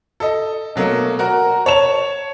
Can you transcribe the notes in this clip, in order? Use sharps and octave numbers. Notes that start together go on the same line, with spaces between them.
A4 D#5
B2 F#3 A3 A#3
F#4 A#4
C#5 A5 F7